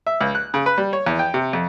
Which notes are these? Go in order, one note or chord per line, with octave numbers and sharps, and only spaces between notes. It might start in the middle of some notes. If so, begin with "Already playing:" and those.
E5
C#2
F#6
C#3
B4
G3
C#5
E2
G5
C3
F2